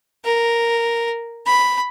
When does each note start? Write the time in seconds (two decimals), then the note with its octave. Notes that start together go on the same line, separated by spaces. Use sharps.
0.25 A#4
1.47 B5